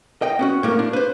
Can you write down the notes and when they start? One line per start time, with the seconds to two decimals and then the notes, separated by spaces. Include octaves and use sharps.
0.22 D#5 G5
0.39 B3 C#4 F#4
0.63 A2 A#3 A#4
0.79 D4
0.93 B4 C5